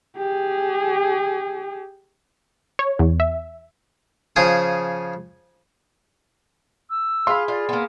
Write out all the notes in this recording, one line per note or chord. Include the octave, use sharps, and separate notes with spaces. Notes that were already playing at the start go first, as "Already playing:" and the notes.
G4 G#4
C#5
E2
E5
C#3 F3 G#4 D#6
E6
F4 G#4 B5 C6
F4 D5
A#3 B3